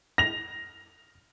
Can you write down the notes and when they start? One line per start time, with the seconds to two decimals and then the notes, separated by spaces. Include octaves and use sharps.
0.18 A#6 F7